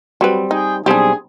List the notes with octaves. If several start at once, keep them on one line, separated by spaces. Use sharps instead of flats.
F#3 G3 C4 B4
D#4 G#4 G5
B1 G3 C4 D4 G4 G#4